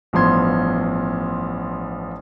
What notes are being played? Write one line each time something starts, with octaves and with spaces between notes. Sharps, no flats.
A1 G2 F3 B3 C6 G#6